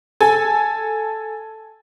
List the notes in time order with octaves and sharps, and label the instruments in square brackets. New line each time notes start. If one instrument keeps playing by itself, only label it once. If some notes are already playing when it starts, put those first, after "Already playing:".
[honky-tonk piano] A4 G#5